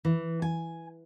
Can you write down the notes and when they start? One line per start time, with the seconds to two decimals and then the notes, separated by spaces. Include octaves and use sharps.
0.05 E3
0.42 G#5